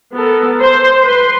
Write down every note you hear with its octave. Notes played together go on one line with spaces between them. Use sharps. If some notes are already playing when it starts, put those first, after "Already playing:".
B3 A4 A#4
C5
B4 C6